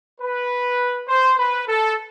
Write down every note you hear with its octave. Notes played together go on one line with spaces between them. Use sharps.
B4
C5
B4
A4